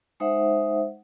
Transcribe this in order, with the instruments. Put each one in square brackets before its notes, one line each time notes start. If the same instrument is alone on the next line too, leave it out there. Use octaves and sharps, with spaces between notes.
[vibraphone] G#3 D#4 C5 E5 F#5